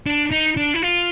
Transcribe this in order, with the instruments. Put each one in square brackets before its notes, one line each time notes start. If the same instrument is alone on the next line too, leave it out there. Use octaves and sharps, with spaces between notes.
[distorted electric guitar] D4
D#4
D4
E4
F4